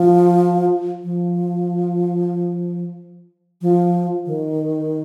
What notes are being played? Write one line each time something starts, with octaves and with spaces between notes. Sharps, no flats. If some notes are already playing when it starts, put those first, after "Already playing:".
Already playing: F3
F3
F3
D#3